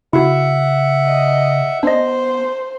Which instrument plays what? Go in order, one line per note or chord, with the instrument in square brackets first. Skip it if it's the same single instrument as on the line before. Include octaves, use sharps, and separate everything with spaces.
[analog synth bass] C#3 [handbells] E4 F#4 [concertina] E5 F#5
[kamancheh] D#5
[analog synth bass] B3 [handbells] D4 D#5 [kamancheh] C5